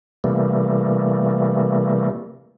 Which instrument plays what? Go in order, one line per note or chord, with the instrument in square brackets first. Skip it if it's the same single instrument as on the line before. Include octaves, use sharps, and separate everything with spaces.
[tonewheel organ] C3 E3 G3 A3 A#3